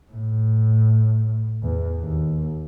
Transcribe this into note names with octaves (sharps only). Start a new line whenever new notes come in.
A2
E2
D#2